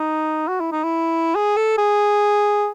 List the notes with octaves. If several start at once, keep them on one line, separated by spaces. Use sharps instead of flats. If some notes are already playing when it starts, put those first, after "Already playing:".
Already playing: D#4
F#4
E4
D#4
E4
G#4
A4
G#4